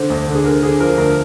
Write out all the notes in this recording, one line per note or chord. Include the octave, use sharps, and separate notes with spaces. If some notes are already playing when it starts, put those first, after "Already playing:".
Already playing: D3 C5
D2
D3
G#4
D3 A#4
D3 G#4
F3 A#4
D2 A#4